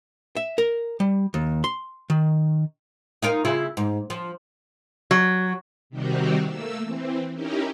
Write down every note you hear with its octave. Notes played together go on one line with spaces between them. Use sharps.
E5
A#4
G3
D#2
C6
D#3
D#4 F4 A#4
C#3 E4 F4
G#2
F3
F#3
C3 D#3 G3 C4 F#4 G4
A3 A#3 E6
E3 C4
C#4 D#4 E4 G4 A#4